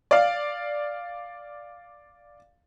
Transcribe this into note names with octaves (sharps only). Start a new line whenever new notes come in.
D5 F5